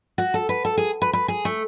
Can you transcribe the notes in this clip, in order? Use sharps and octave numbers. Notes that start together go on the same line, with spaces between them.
F#4
A4
B4
A4
G#4
B4
B4
G#4
A3